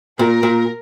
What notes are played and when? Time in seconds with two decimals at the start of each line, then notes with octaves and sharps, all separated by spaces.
0.19 A#2 A#4
0.43 A#2